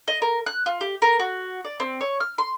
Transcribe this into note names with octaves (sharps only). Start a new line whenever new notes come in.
D#5
A#4
F#6
F4
G4
A#4
F#4
D5
C4
C#5
F6
C6